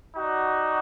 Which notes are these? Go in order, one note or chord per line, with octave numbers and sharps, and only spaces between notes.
D#4 F#4 D5